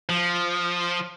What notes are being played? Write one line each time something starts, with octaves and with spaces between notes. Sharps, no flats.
F3